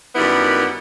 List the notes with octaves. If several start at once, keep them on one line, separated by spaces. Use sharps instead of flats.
F#2 D#3 G3 B3 E4